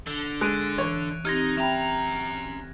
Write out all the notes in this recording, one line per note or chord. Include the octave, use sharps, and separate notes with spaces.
D3
G#3 F#6 D7 D#7
E3 C#5
C4 D#4 G4 F6 G#6 A#6
C#4 E5 G5 A#5 B5